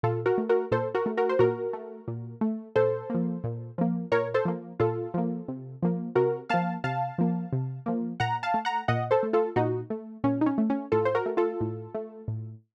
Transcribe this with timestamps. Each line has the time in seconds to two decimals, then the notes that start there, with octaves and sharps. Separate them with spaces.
0.03 A#2 F4 A4
0.26 F#4 A#4
0.38 A3
0.49 F#4 A#4
0.71 A#2 A4 C5
0.95 F#4 A#4
1.06 A3
1.17 F#4 A#4
1.29 C5
1.39 A#2 F#4 A#4
1.73 A3
2.08 A#2
2.41 A3
2.76 A#2 A4 C5
3.10 F3 A#3
3.44 A#2
3.78 F3 A#3
4.12 A#2 A#4 C#5
4.34 A4 C5
4.45 F3 A#3
4.80 A#2 F4 A4
5.14 F3 A#3
5.48 C3
5.82 F3 A#3
6.15 C3 F#4 A#4
6.49 F3 A#3 F5 A5
6.84 C3 F5 A5
7.18 F3 A#3
7.53 C3
7.86 F3 A#3
8.20 A#2 F#5 A#5
8.43 F5 A5
8.54 A3
8.65 F#5 A#5
8.88 A#2 D#5 F#5
9.11 A4 C5
9.23 A3
9.33 F4 A4
9.56 A#2 D#4 F#4
9.90 A3
10.24 A#2 C#4
10.41 D#4
10.46 C#4
10.58 A3
10.70 C#4
10.92 A2 F4 A4
11.05 C5
11.15 F#4 A#4
11.26 A3
11.37 F4 A4
11.61 A2
11.95 A3
12.28 A2